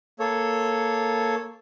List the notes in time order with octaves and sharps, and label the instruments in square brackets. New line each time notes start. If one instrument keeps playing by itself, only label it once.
[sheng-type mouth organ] A#3 A4 C#5